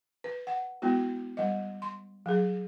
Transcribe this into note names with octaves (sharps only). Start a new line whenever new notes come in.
B4
F#5
G#3 B3 E4 F#4
G3 D#5
C6
F#3 G#4